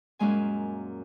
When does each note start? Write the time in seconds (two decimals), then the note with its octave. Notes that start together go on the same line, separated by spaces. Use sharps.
0.19 F#2 A#2 G#3 G#5